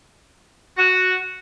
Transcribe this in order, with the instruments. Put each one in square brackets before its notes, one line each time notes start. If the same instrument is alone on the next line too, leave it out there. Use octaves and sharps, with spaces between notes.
[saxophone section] F#4